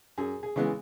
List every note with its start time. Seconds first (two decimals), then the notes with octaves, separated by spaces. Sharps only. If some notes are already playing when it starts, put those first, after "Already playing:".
0.18 F#2 G#4
0.43 G#4
0.56 C#3 E3 G#3 B3